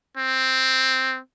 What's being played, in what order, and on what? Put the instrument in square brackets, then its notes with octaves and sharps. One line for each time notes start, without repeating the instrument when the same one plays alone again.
[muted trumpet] C4